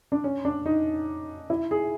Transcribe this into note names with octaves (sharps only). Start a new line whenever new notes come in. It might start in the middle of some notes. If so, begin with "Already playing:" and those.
D4
C#4
D4
D#4
E4
G#4